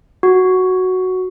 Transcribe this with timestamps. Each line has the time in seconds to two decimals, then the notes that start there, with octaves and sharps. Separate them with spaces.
0.23 F#4